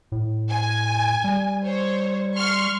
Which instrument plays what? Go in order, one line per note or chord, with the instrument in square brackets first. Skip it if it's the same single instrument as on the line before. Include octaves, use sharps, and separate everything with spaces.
[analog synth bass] A2
[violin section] G#5
[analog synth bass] G3
[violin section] C5 C#5
C6 C#6 F6